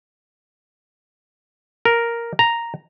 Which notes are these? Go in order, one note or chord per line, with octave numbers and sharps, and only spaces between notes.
A#4
A#5